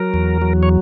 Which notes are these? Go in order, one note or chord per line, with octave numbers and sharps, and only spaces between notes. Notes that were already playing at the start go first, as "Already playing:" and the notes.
Already playing: F#3 A#4
E2
F#3
C#5